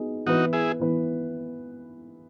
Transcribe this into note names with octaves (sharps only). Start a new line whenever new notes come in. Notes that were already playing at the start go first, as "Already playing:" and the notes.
Already playing: F#3 B3 D#4 G#4
E3 B3 D#4 E4 F#4 B4
E4 G#4
E3 B3 E4 B4